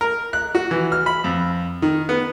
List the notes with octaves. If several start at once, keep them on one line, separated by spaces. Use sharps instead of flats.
A#4
F#6
F#4
E3
F6
B5
F2
D#3
B3